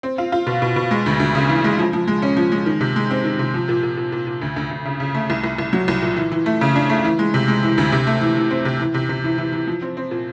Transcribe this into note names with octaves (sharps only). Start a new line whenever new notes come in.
C4
F4
F4
B2
B2
B2
G#3
D2
D2
C#3
E3
G#3
F3
F3
G#3
C#4
F3
G#3
D#3
C3
G#3
C4
D#3
C3
F3
A#2
A#2
A#2
A#2
A#2
D2
D2
D2
C#3
C#3
A3
C2
C2
C2
F#3
C2
A#2
E3
E3
A3
C#3
D4
A3
E3
G#3
C3
G#3
E3
D2
C3
A3
E3
E3
C4
C3
E3
C3
C3
E3
E3
E3
F3
C4
C4
A#2